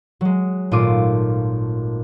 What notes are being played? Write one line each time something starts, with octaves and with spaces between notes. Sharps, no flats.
F#3 G#3
G#1 A#2 A3 F4 D6 D#7